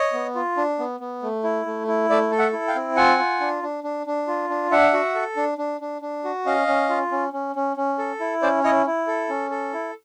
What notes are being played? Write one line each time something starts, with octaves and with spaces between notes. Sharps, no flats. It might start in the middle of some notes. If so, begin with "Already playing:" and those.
Already playing: C#5 D#5
B3
F4
D4
B3
B3
A3
E4
A3
E4
A3 D5 E5
A4
E5 F#5
E4
F5 G5
C4
F4 F#5 G#5
F4
D4
D4
D4
D4
F4
D4
D4 E5 F#5
F#4
A4
D4
D4
D4
D4
F#4
C#4 D#5 F5
C#4
F4
C#4
C#4
C#4
C#4
A4
E4
C#4 C5 D5
E4 C#5 D#5
E4
A4
C#4
A4
E4